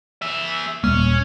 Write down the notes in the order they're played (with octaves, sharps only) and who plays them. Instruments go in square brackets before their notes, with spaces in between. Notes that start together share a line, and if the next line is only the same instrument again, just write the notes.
[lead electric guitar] G#4 E5
[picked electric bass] D#1 G3 A#3 [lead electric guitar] C#4